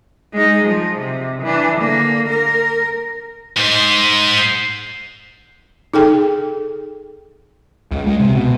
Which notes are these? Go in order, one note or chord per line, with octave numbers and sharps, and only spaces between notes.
G#3 D#4
F3
C3
E3 D4
D3 A#3
A#4
G#2 C5
D#4 G#4 A4 G5
C#2
G#3
C3
B2